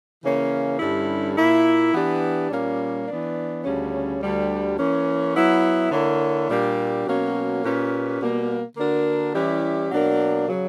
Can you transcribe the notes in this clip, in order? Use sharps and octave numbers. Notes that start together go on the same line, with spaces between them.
C#3 E3 A#3 C#4
G2 D3 G3 C#4 E4
A#2 A#3 E4
E3 B3 D4 G4
A#2 G3 A#3 C#4
E3 B3 D4
D2 C#3 G3 C#4
D2 D3 G3
E3 A#3 C#4
F#3 B3 E4
D3 A#3 E4 A#4 C#5
A#2 G3 A#3 D4 G4
B2 F#3 A#3 C#4
A#2 A#3 C#4 G4 B4
B2 G3 A#3
D3 A#3 D4 F#4 A#4
E3 G3 C#4 E4 G4
B2 F#3 A#3 D4 A#4
C#3 F#3